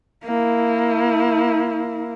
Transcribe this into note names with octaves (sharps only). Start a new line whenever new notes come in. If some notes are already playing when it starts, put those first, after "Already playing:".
A#3 E4